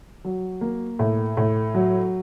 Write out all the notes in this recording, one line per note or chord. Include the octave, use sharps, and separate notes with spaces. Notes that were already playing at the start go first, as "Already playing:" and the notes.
F#3
A#3
A2
A2
F#3